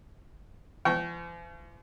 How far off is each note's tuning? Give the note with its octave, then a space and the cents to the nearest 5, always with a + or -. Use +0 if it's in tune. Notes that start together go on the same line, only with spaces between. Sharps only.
F3 -45 G5 -30 C#6 +0